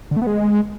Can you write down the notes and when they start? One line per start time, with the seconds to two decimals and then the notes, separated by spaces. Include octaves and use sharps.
0.11 D3
0.16 A3
0.22 B3
0.27 G#3